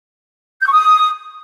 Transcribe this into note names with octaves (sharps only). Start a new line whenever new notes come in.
G6
C#6
D#6